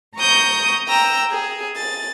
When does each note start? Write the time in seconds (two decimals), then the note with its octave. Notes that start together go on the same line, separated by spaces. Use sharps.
0.16 A#5 C#6 D#6 G6
0.87 G5 A#5 E6
1.30 G#4
1.76 A6